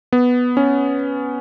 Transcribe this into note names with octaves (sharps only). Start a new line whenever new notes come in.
B3
C#4